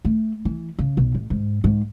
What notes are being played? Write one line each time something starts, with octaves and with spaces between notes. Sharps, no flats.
A3
E3
C#3
B1
A1
G#2
G#2